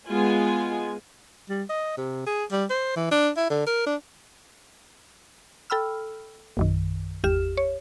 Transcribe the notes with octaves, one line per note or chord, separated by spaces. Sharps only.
G#3 B3 F4 G#5
G3
D#5
C3
G#4
G3
C5
E3
D4
E4
D3
A#4
D4
A4 G5 B5 E6 F6
A#1 F#2 D#3
G#1 E2 G4 F6 E7
C#5